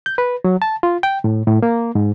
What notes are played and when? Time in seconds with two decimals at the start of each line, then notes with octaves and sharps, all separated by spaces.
0.06 G6
0.18 B4
0.44 F#3
0.62 A5
0.83 F4
1.03 G5
1.24 A2
1.47 A2
1.63 A#3
1.95 G#2